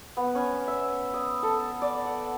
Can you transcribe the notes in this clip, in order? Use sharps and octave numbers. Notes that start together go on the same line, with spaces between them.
B3
C#4
E5
D#6
A4
D5
F#5